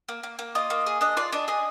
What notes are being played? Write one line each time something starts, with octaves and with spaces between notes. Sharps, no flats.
A#3
A#3
A#3
F4 D#5
A#3
G#4
D4 D#5
F4 D5
D4 D#5
G#4 D#5